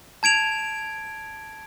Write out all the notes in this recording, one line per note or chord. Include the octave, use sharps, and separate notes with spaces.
A5 G#6 D7 F7